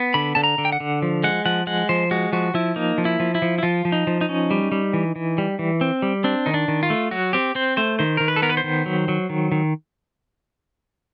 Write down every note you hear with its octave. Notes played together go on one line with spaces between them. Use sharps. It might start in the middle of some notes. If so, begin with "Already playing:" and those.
Already playing: B3
D3 B5
D3 A5
A#5
D3
G5
F#5
D3
F3
G#3 F#5
F3 F#5
G#3 F#5
F3 C5
G#3 F#4
F3 F#4
F3 E4
A#3 D#4
F3
E4
F3
E4
F3
E4
F3 F4
F3
D#4
F3
D#4
C#4
G3
G3
E3
E3
G3
E3
C4
G3
C4 D4
D#3 D#4
D4
D#3
F4
A3
F#3 F#4
C4 G4
C4 C5
A3 C5
D#3 C5
D#3 A#4
B4
A4
B3 A#4
B4
C5
D#3
F#3
F#3
D#3
D#3